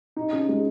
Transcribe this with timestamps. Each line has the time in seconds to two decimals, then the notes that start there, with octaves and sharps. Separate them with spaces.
0.16 D#4
0.32 C#3
0.49 G#3